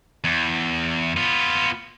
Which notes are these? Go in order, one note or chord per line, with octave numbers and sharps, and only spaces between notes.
E2
B3 F4